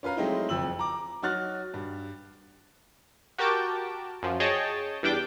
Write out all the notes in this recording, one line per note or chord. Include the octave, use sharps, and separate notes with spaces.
C#4 F4 B4 F5 A#5
F#3 G#3 A3 C4 D#4 E4
F#1 F2 E6 F#7
A#5 D6
F#3 D#4 F#4 F6 F#6 A6
G2
F#4 G4 A#4 G5 A5 D6
F#2 F3
G#4 C#5 D#5 G5 A5
E2 G3 D4 G5 D6